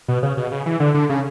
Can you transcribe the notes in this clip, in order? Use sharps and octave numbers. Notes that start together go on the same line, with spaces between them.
B2
C#3
B2
C#3
E3
D3
D3
C#3